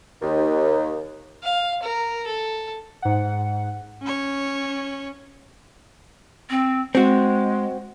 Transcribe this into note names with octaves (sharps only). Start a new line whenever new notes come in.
D#2
F5
A#4
A4
G#2 F#5
C#4 C#5
C4
G#3 C4 F#4